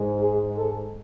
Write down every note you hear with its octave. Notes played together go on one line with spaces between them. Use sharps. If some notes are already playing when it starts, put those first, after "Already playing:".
Already playing: G#2 G#3
G#4
A4